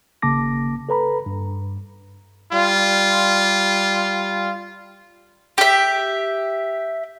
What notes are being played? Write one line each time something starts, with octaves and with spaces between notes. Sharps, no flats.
G#1 C#3 A#3 A5 D6 A#6
A4 B4 A#5 B5
G2
G3 F4
G4 E5